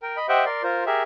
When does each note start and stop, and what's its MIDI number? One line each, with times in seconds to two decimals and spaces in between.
0.03 0.17 70
0.03 0.17 79
0.17 0.27 75
0.17 0.27 83
0.29 0.45 67
0.29 0.45 72
0.29 0.45 75
0.29 0.45 76
0.29 0.45 78
0.29 0.45 79
0.46 0.63 70
0.46 0.63 74
0.46 0.63 84
0.63 0.84 65
0.63 0.84 70
0.63 0.84 72
0.86 1.03 67
0.86 1.03 68
0.86 1.03 70
0.86 1.03 76